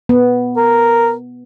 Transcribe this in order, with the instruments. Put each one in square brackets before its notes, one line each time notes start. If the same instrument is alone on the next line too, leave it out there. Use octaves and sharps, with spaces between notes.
[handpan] B3
[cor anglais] A#4